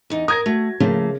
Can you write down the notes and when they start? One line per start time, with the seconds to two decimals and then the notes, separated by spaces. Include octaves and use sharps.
0.10 E2 D#4
0.28 A#4 D#6 G#6 A#6
0.46 A3 F#4
0.80 C#3 F3 A3 A#3